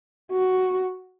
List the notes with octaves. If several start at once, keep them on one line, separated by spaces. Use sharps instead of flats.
F#4